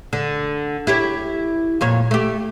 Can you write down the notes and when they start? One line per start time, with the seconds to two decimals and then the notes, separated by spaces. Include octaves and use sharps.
0.13 D3
0.87 E4 G4 C#5
1.81 F2 A#2 C#5
2.11 A3 G4